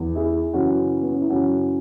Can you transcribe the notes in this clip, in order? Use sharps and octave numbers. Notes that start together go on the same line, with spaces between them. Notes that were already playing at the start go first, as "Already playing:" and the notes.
Already playing: E2 E3
E4 G#4
F#2 C#3 E3 C#4 F#4
B3
C#4
E4
F#2 C#3 E3 C#4 F#4